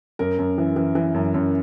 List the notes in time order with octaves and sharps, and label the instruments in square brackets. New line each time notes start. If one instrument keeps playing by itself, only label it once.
[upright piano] F#2 A#4
F#2
E3
E3
E3
F#2
F#2